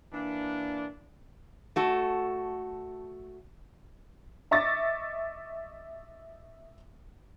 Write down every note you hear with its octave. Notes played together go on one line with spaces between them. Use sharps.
E3 A#3 D4
A3 F#4 A4
D#5 E5 C#6 D6 A6 A#6